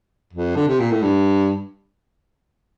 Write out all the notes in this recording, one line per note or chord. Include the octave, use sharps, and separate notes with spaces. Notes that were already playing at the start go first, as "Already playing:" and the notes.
F2
D3
C3
A#2
A2
G2